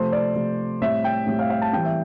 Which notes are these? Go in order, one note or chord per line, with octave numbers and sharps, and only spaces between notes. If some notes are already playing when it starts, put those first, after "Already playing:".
Already playing: C3 F3 A3 C5
D5
C3 F3 A3
A2 G3 C4 E5
G5
A2 G3 C4
F5
F5
A5
E3 G3 C4 G5
E5